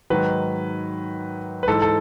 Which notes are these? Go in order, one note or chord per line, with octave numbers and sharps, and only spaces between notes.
G#2 D#3 F#3 B4
B4
G#2 E3 A4
A4